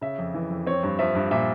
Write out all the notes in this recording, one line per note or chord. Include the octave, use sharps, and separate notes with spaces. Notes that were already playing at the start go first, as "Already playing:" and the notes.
C#3 E5
F2
E3
F2
C4 C#5
G2
F3 E5
G2
A#2 E5